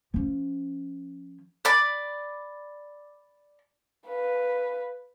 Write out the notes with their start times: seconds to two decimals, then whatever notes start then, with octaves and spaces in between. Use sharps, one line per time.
0.14 F3 C#4
1.65 D5 B5 D6
4.07 B4 F5